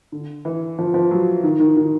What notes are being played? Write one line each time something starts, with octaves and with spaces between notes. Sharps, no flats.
D3
E3
F3
F3
F#3
D#3
D#3
D#3